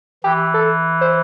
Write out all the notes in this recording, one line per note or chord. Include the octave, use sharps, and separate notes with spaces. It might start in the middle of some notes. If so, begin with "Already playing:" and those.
E3 G4
A4
C5